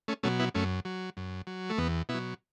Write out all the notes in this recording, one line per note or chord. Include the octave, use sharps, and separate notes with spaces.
A3 C#4
B2 F#3 A3 C#4
B3 E4
F#2 A3 C#4
F#3
F#2
F#3
A3
E2 B3
B2 B3 E4
F#3